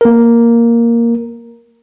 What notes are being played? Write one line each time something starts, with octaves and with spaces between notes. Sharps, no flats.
A#3 A#4